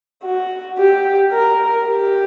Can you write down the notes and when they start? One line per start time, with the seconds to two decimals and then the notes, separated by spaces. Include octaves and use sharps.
0.24 F#4
0.79 G4
1.32 A#4
1.87 G4